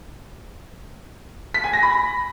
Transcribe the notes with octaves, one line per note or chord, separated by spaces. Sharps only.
B6
G#5
A#6
B5